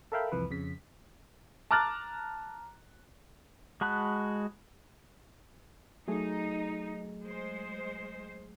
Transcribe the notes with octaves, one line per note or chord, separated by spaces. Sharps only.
A4 A#4 E5 F5 G5 B5
C2 F2 E3 B4
F2 C#3 B6
A5 A#5 D6 F6 F#6 A6
G#3 F#4 A5 B5 F#6
F#3 A3 D#4 G#4
G#3 C5